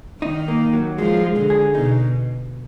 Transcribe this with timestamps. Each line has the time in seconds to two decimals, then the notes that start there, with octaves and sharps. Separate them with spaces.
0.22 D#3 D#4
0.48 A#3
0.73 F#3
0.98 F3 G#3
1.24 G#3
1.37 D3
1.50 G#4
1.75 B2 D#4